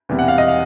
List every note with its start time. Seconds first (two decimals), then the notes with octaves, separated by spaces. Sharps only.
0.09 E1 E2 C3 E3 G3
0.19 F#5
0.28 F5
0.38 D#5
0.48 F5